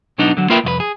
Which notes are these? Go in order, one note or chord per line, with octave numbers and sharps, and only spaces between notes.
B1 F#3 B3 D4 D#4
D3 F#3
A#3 F4 A#4 B4 E5 G5
C2 F2 F4 B4
G#4